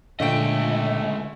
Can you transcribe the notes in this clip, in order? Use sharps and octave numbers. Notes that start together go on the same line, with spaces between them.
C#2 A#2 D3 A3 D#5 G5 D7